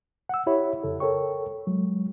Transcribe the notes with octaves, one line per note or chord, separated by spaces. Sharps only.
F#5 E6
E4 G4 C#5 E5 B5
F2 C#3 A4
A4 A#4 C#5 G5 C#6
F#3 G#3